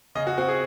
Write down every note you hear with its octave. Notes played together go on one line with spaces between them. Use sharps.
C#3 D#5
F#4
C4 F#4
G#4